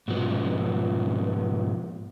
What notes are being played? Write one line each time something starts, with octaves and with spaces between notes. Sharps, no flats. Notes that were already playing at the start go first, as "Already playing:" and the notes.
G#2 B2 F3